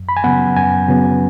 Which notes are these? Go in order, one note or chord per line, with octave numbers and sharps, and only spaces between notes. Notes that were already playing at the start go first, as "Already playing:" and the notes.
Already playing: F#2
B5
G#5
C#3 F#3 B3 F#5
F#2 G#5
C#3 F#3 B3